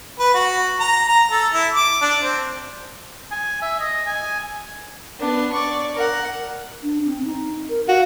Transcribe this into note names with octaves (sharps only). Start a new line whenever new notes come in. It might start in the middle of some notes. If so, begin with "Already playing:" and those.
B4
F#4
A#5
A#5
A4
E4
D6
D4
C4
G#5
E5
D#5
G#5
B3 D4
D5 C#6
A#4 F#5
D4
C4
D#4
A#4
F#4 F5